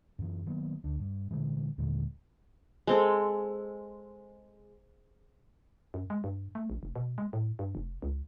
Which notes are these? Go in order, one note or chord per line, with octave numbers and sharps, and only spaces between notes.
F#2 E3
D#3 F#3 A#3 B3
D2 D4
G2
A#2 D3 E3 G#3
D#2 A#2 D3 G#3
G#3 C4 A4
F#2
G#3
G2
A3
A#1
F1
B2
G#3
A2
G2
F1
C#2